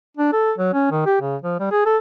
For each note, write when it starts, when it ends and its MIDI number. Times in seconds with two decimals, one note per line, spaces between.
0.17 0.32 62
0.33 0.52 69
0.58 0.71 54
0.74 0.88 61
0.91 1.03 51
1.06 1.17 67
1.21 1.36 49
1.42 1.58 53
1.60 1.67 55
1.71 1.85 68
1.86 1.97 69